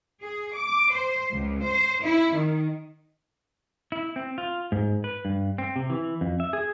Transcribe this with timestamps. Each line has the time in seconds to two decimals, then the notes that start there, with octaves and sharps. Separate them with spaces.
0.22 G#4
0.56 D6
0.92 C5
1.32 C#2
1.64 C5
2.03 E4
2.34 D#3
3.92 E4
4.16 C4
4.38 F4
4.72 G#2
5.04 B4
5.25 G2
5.58 C4
5.76 C3
5.90 E3
6.21 F2
6.40 E5
6.53 G#4